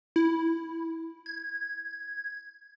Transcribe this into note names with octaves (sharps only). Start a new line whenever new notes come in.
E4
G#6